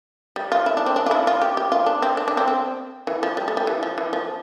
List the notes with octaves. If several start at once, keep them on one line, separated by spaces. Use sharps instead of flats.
G3
F4
E4
D4
C4
D4
F4
E4
F4
G4
G4
F4
D4
C4
D4
D4
C4
C4
E3
F3
G3
A3
G3
E3
F3
E3
F3